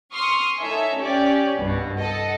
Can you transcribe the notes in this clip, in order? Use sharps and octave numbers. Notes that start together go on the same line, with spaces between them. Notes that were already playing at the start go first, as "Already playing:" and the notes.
C6 C#6 D#6 F6
D#4 A4 C#5 E5 G#5
C#4 G4 C#5 D5
C2 G2 B2
A4 D#5 F#5